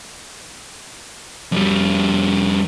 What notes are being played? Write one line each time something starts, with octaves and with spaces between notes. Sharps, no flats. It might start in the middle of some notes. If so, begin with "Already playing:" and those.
F2 G3